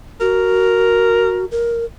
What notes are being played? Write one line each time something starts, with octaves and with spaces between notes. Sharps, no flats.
F#4 A#4
A#4